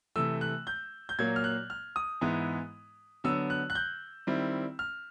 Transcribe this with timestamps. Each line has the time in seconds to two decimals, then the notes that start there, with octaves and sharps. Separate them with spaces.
0.16 C3 E3 A3 E6
0.41 F#6
0.67 G6
1.09 G6
1.19 A#2 F#3 A#3 G#6
1.36 F6
1.44 F#6
1.70 F6
1.96 D#6
2.21 G#2 E3 G#3 B3 E4
3.24 D3 F#3 B3 E6
3.50 F#6
3.70 F#6
3.75 G6
4.27 D#3 G3 C4 E4
4.79 F6